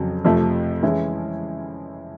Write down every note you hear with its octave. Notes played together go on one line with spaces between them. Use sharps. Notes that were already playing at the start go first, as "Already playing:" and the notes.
Already playing: F2 C#3 F#3
F2 C3 F3 A3
E3 G#3 C#4 E4